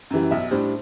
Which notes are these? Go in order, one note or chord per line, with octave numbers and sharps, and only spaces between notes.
F#2 E3 G3
B1 E5
A2 G3 D4 C5